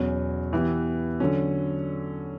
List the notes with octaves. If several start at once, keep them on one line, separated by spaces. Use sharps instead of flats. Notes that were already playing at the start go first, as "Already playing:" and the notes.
Already playing: E2 B2 F#3 C#4
E3 B3 E4 G4
D3 F#3 C#4